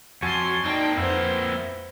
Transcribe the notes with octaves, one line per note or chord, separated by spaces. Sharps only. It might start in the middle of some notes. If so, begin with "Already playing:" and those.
F2 F#4 C#5 G#5 A5 C6
A#3 C4 D#4 D5 G5 A5
F2 B3 E4 C5